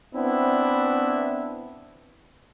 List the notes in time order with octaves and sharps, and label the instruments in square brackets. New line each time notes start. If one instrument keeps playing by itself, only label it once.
[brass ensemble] B3 C4 D4 E4